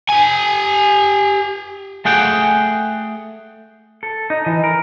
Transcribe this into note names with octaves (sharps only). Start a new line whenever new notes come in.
G4 G#5
A3 G#4 F#5 G5
A4
D#4
E3
A#4